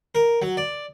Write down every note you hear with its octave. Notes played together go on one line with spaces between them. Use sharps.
A#4
F#3
D5